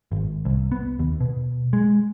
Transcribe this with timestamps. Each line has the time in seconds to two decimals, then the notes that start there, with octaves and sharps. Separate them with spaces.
0.12 G#1
0.45 C2
0.72 B3
0.99 D#2
1.21 B2
1.73 G#3